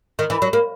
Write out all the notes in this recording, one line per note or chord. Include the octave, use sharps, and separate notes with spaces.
D#3
E3
F#3
A#3